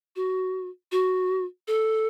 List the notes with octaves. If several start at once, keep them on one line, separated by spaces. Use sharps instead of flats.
F#4
F#4
A4